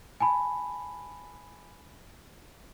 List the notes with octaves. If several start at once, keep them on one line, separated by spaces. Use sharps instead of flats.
G#5 A5 B5